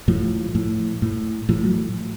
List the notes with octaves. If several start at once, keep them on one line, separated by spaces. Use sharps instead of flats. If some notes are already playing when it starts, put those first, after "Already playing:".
A2 F3
A2
A2
A2 F3
F#3